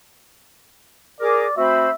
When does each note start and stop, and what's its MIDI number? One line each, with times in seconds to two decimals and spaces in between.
1.20 1.46 68
1.20 1.45 70
1.20 1.56 74
1.20 1.46 86
1.57 1.89 57
1.57 1.89 60
1.57 1.89 66
1.57 1.89 72
1.57 1.93 76
1.57 1.89 83